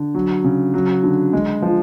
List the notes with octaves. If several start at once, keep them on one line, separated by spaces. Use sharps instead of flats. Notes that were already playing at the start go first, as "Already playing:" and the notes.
Already playing: D3
F#3
C#3
F#3
D3
G#3
F3